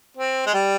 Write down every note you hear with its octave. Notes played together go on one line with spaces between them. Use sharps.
C4
G#3
G3